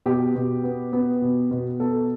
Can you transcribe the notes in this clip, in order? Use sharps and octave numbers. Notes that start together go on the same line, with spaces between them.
B2 G4
B2
B3
B3
B2
B2
B3 A4